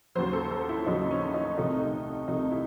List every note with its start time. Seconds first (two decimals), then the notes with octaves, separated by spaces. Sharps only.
0.15 D#2 C#3 F#3 C5
0.33 A4
0.51 A4
0.69 E4
0.86 D#2 C#3 F#3 D#4
1.11 C#4
1.34 D#4
1.57 C2 C3 D#3 A3 D#4
2.28 C2 C3 D#3 A3 D#4
2.51 E4